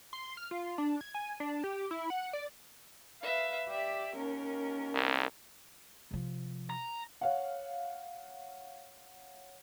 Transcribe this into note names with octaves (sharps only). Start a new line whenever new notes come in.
C6
F6
F4
D4
G#6
G#5
D4
G4
E4
F#5
D5
B4 E5 F5
G4 D5 E5
D#2 C#4 A#4
C2
C3 F3
A#5
C#5 F5 F#5